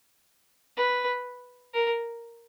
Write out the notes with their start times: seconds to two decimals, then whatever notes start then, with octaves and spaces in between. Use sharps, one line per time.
0.77 B4
1.74 A#4